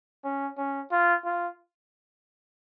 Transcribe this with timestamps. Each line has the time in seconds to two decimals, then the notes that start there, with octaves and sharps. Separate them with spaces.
0.24 C#4
0.58 C#4
0.92 F4
1.25 F4